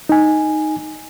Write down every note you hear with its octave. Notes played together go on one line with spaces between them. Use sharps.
D#4 G#5